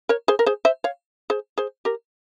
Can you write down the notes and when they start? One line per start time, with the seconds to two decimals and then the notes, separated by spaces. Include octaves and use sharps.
0.09 A#4 C#5
0.28 G#4 C5
0.39 A#4
0.46 G#4 C5
0.65 C5 E5
0.84 C#5 F5
1.30 G#4 C5
1.58 G#4 C5
1.85 G4 A#4